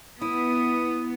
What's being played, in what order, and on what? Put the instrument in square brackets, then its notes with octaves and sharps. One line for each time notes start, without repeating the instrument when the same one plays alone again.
[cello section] B3 [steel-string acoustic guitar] E4 [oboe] D#6